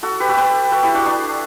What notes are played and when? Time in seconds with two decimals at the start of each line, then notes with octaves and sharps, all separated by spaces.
0.03 F#4 A4
0.20 G4 B4
0.29 F#4 A4
0.37 G4 B4
0.72 F#4 A4
0.83 E4 G4
0.94 D4 F#4
1.06 D4